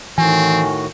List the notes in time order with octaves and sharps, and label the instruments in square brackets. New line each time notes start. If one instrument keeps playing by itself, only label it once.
[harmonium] A2 D#3 F#4 [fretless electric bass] E3 [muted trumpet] C4 [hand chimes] G#5